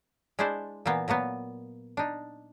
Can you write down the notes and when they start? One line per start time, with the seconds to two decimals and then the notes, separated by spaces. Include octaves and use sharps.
0.39 G#3 D4 E4 C5 D5
0.86 A#2 E3 A#3 B3
1.08 A#2 F#3 A#3 B3
1.97 D4 D#4